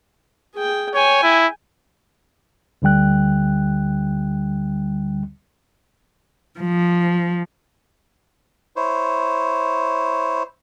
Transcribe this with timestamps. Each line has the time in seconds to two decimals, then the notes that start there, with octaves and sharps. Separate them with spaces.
0.55 G#4 G5
0.94 C#5 G5 G#5
1.23 E4
2.82 D2 D3 G3 G5 F#6
6.60 F3
8.76 E4 C5 C#5